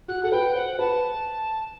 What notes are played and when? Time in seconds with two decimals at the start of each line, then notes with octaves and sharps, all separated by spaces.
0.08 F#4 F#6
0.23 A4 F#5
0.32 B4 G5
0.55 C5 F#5
0.79 B4 A5